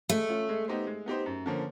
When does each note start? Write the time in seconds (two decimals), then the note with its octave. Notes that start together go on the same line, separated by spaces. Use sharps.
0.09 G#3 A3
0.29 C#4 F4
0.49 G#3
0.68 B3 D#4 G4 C5
0.87 G#3
1.06 B3 D#4 G4 C5
1.26 F#2
1.46 D3 F3 A#3 C#4